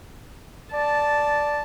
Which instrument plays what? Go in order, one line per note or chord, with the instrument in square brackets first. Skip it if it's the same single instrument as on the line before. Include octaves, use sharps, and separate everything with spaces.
[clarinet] D5 [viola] A5